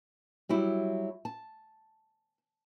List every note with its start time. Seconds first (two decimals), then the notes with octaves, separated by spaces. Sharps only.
0.49 F#3 G3 E4 F#4
1.25 A5